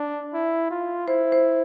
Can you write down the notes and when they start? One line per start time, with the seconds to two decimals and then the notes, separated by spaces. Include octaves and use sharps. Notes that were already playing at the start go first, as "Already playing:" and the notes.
Already playing: D4
0.34 E4
0.71 F4
1.07 E4 C5
1.32 C5